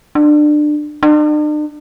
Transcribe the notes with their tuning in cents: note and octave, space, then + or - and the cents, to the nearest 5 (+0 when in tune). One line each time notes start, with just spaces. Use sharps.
D4 +25
D4 +45